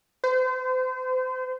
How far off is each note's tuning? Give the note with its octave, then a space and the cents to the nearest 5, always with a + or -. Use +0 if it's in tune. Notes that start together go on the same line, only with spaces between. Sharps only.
C5 -35